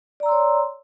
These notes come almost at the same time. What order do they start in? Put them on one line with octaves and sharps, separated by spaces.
D5 A#5 E6 C6 C#5